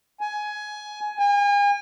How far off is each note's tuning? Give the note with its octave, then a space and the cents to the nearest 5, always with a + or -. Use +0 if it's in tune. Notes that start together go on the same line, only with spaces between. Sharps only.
G#5 +15
G#5 -40